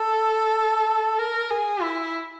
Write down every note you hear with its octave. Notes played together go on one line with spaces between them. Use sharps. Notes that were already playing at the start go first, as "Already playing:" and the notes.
Already playing: A4
A#4
G#4
E4